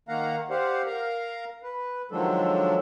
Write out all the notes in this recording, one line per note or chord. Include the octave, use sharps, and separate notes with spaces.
D#3 A#3 F5 F#5 A#5
G4 C5 D5 F5 F#5
A#4 F5 A#5
B4
D#3 F3 F#3 G#3 D4 A4